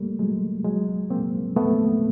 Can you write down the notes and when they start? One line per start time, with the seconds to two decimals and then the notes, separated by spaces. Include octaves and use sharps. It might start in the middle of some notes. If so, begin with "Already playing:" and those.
Already playing: G3 A3 A#3
0.19 F#3 G#3
0.65 F#3 G#3
1.10 A#3 C4
1.56 A3 B3